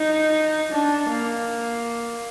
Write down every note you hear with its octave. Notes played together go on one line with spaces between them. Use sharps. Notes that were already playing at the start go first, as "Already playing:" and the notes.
Already playing: D#4
D4
A#3